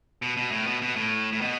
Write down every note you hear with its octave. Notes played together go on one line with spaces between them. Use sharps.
B2
B2
A2
B2
B2
A2
A2
B2